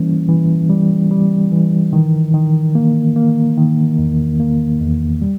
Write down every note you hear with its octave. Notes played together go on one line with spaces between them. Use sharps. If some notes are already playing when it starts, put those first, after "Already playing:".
Already playing: E3 G3 A#3 C#4
E3
G3
G3
E3
D#3
D#3
A#3
A#3
D#3
E2
A#3
E2
G3